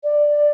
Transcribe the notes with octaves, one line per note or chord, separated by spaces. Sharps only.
D5